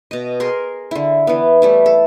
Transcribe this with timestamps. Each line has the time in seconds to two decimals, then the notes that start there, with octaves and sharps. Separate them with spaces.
0.11 B2 D#5
0.40 G#4 A#4 C6
0.91 D3 E4
1.27 E3 B3
1.62 G3 A3 E4
1.86 A4